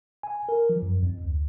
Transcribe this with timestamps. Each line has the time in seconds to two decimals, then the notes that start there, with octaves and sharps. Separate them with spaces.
0.23 G#5
0.49 A#4
0.70 F3
0.82 F#2
1.03 F2
1.24 D2